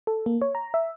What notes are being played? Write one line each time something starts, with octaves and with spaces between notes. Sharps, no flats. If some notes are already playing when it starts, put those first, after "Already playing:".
A4
A#3
C#5
A#5
E5